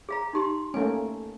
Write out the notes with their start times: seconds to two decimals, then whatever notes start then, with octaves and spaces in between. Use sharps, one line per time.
0.09 G#4 F5 A#5
0.33 D#4 G4 C6
0.74 A3 A#3 C#4 G#5